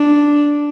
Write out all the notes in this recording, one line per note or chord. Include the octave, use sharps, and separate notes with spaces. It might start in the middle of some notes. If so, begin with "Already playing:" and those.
Already playing: D4